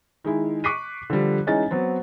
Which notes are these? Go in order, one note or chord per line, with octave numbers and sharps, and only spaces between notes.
D#3 G#3 E4
C#6 D6 F#6 B6 C7 D#7
D3 F3 G3
E3 G#3 C#4 D#4 A6
F#3 B3 C4